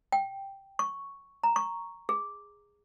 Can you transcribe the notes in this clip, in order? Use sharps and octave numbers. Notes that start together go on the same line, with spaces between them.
G5
C#6
A#5
C#6
G#4